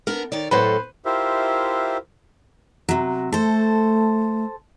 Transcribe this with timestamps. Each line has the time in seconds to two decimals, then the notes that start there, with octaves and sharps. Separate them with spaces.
0.07 B3 D4 A#4
0.32 D#3 C#5 D5
0.51 A2 F#3 A4 B4 C5
1.05 E4 F4 G4 A#4 C5 E5
2.89 C3 F#3
3.33 A3 A4 C5